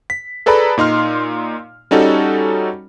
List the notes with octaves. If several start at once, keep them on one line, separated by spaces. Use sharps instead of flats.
B6
G#4 A4 B4 D5 A#5 B5
A#2 D#4 C6 F6
G3 C#4 D#4 F#4 A4